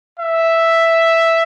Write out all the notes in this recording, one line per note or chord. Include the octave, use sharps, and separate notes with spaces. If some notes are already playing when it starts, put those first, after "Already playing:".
E5